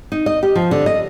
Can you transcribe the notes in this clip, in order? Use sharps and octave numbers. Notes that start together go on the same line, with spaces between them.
D#4
D#5
G4
F3
D3
D#5